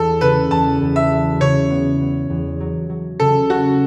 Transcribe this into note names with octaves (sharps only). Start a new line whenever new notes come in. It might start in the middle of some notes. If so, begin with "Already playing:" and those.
Already playing: E2 A4
C#3 B4
E2 A5
E2
E5
F#3
C#3 C#5
B3
B3
E2
F#3
F#3
C#3 A4
C#4 F#4